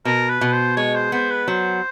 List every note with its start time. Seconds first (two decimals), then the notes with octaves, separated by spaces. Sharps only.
0.05 B2 A#4
0.29 B4
0.41 B2
0.52 C5
0.77 G#3 C#5
0.95 C5
1.12 B3 C5
1.30 B4
1.48 F#3 C5